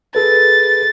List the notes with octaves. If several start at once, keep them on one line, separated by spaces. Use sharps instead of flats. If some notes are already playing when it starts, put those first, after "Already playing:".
G#4 A4 B4 A6